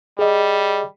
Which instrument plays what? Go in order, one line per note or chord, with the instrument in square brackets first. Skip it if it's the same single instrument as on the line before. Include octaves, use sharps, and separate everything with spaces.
[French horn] G3 [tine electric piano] G#4 D#5